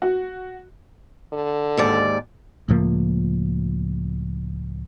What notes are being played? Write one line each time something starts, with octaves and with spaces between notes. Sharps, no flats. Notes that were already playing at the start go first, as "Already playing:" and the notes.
F#4
D3
D#2 G#2 D5
C#2 A2 F3 A#3